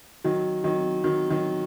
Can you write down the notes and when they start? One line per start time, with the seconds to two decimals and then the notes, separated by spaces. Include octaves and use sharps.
0.24 D#3 F#3
0.64 D#3 F#3
1.04 D#3 F#3
1.30 D#3 F#3